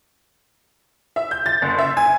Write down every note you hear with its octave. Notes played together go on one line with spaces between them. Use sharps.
E5
G6
A6
F#1
E5
G#5